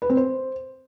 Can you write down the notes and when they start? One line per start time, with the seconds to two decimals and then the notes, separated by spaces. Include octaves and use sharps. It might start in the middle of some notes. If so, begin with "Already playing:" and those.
0.02 B4
0.09 C4
0.17 C5